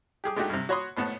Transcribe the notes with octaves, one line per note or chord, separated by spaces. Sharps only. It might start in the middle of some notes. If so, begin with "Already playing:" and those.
G4 G#4 D6
G#3 A3 D4 D#4 F#4 G4
G2 C3
F#4 C#5 B5 C6 D#6
G#1 A2 B3 A5